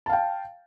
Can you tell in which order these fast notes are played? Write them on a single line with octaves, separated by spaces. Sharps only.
A5 F5 G5